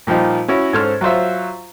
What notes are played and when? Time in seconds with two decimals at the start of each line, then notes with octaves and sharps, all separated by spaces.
0.07 A#2 F3 G3 D#4 F4
0.48 C#4 E4 F#4
0.73 G#2 C#4 A4 C5 F6
1.01 F#3 F4 C5 E5